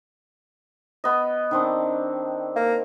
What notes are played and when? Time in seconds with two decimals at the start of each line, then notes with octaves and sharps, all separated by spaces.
1.04 B3 D#5
1.51 D#3 C4 D4
2.56 A#3